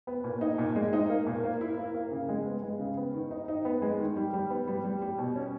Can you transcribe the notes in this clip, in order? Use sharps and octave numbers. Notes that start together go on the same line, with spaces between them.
B3
A#2
D#4
A#2
G#3
D#4
A#3
A#2
A#3
E4
A#3
A#3
C#3
G#3
B3
G#3
C#3
B3
D#3
D#4
D#4
B3
G#3
D#3
G3
G3
B3
G3
G3
G3
B2
C#4